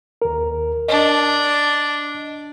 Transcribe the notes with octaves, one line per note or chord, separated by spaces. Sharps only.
D#2 A#4
D4 D#5